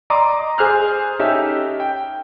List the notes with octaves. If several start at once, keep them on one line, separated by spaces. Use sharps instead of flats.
D5 D#5 A#5 C6 D6 D#6
G#4 C5 F6 F#6
C#4 D#4 G4 A4 E5
G5